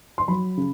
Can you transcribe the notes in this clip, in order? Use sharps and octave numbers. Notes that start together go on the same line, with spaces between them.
C6
F#3 B5
C#3